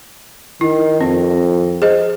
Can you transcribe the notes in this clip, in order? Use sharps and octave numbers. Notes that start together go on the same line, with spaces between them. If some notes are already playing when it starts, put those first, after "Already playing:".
D#3 E4
F2 C4
G#4 C5 D#5